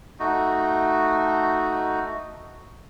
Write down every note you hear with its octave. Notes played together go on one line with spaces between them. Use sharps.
A3 D#4 F#4